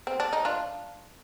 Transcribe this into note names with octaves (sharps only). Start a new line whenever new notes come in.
C4
D4
D#4
D4 F4